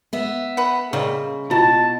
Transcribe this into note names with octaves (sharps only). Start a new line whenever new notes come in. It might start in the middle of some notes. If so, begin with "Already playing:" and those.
B3 E5
B4 F#5
C#3 G3 G#3 A#3 E6
B2 E4 F4 A5